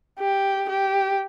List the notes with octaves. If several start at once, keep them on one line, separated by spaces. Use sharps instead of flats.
G4
G4